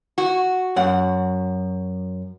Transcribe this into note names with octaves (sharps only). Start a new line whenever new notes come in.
F#4
F#2 F#5